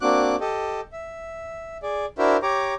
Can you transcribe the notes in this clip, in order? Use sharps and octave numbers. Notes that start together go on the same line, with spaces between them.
A#3 C4 D4 F#4 D6 F#6
G4 A4 D#5
E5
G#4 D5
D4 E4 F#4 A#4 C5 E5
G4 C#5 A#5 D6